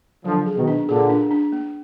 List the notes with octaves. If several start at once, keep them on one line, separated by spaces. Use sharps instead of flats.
D3 F3 F#3
G#4
B2 D#3
D4
A#2 D3 G#4
D4
D4
A#3